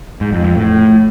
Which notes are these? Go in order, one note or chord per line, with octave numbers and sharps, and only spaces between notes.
G#2
F2
F2
A2